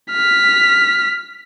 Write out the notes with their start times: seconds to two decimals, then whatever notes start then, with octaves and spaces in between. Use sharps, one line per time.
0.12 F6 B6